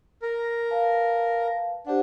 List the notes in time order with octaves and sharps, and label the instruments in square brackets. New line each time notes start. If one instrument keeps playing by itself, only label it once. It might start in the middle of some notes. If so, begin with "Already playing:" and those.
[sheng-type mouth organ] A#4
[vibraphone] B4 F5 A5
[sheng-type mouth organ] D4 [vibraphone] G4 C5 F#5